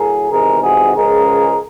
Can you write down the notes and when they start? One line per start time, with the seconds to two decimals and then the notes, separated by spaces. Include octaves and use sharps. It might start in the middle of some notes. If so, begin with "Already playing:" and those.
Already playing: A2 F#3 G#4 A#4
0.30 E2 C3 D#3 G#3 G#4 A#4
0.62 F#4 G#4
0.94 C#2 C#3 F3 G#3 G#4 A#4